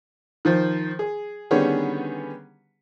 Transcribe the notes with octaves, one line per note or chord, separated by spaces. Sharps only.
D#3 F3 C5
G#4
D3 D#3 G3 B3 C#4 G#4